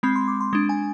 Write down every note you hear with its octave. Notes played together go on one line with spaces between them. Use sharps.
G#3 C4 B5
C6
D6
C6
G#3 D4
G#5